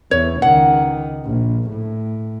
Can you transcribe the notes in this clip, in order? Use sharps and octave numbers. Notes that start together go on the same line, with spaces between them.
E2 C#5
C#2 D#3 F#5
A#1
A2